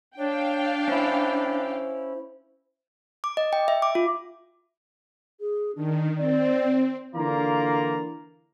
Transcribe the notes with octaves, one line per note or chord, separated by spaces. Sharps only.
D4 C#5 F5 G5
C#4 E4 C5
D6
D#5
G5
E5
D6
F4
G#4
D#3 D4
C4 D5
D3 E3 A#3 F4 D5 A#5